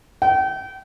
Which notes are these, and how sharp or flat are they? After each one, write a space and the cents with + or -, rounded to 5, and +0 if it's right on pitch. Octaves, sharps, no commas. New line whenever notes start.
G5 -35